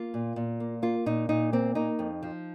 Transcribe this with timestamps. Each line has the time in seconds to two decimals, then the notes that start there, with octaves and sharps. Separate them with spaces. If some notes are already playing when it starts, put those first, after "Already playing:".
Already playing: A#3 F4
0.14 A#2
0.36 A#2
0.60 A#3
0.82 A#3 F4
1.06 A#2 D#4
1.29 A#2 D#4
1.53 A#3 C4
1.75 A#3 D#4
1.99 F2
2.23 F3